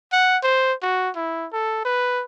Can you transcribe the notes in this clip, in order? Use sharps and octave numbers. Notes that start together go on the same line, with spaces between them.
F#5
C5
F#4
E4
A4
B4